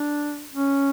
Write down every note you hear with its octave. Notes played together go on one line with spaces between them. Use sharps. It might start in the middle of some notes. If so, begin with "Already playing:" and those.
Already playing: D4
C#4